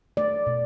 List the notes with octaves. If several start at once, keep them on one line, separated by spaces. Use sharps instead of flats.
A3 D5
B2